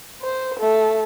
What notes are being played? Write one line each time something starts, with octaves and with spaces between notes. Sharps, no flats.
C5
A3